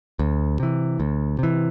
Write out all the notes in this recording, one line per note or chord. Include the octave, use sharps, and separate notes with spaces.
D2
C3 E3
D2
C3 E3